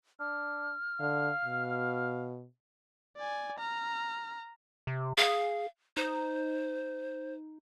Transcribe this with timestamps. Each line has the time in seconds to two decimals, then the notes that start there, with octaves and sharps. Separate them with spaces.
0.20 D4 F6
1.00 D3 F5
1.45 B2
3.17 D5 G#5
3.59 A#5 F6
4.87 C3
5.18 G#4 F5
5.97 D#4 C5